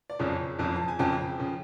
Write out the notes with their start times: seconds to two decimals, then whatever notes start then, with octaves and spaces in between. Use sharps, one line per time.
0.10 D5
0.19 F#1 F2 C#3 F3 C#5
0.59 F#1 F2 C#3 F3
0.76 A5
0.88 G#5
0.99 F#1 F2 C#3 F3 G5
1.38 C#3 F3